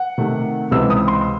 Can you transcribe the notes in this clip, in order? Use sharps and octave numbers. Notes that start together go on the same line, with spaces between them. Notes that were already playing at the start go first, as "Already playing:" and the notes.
Already playing: F#5
C3 D#3 A3
C#2 C3 E3 C4 E6
D#6
C6